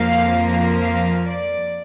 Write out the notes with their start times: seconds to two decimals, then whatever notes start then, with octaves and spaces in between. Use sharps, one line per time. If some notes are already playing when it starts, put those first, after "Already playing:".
Already playing: F2 F3 A#3 F5
0.80 F5
1.26 D5